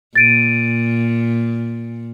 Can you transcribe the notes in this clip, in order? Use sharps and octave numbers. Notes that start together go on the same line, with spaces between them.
A#2 A6 D7 D#7